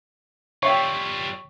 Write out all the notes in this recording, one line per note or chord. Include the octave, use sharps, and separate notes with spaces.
G3 F4 C#5 E5 G5 C#6